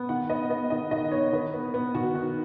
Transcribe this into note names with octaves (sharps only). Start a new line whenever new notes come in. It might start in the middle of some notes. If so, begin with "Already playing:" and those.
Already playing: B3
D#3 F#5
B3 D#5
B3 D#5
D#3 D#5
D#3 D#5
B3 C#5
D#3 B4
B3
B3
D#3 F#4
D#3